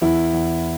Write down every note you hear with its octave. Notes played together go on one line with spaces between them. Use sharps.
E2 E4
E2